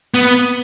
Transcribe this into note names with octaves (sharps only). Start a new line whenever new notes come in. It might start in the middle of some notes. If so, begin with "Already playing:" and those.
B3